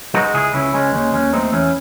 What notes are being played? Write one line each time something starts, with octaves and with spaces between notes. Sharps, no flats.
G#3 D#4 F#4
C#2 E4 G#4
C#2 C#4 E4
G#3 C#4
D#2 C#4
D#2 C#4
A3 C4 D#4
E2 C#4 E4